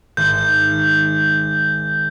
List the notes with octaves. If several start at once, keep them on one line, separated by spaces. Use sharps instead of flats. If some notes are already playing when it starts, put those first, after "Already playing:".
G#1 G6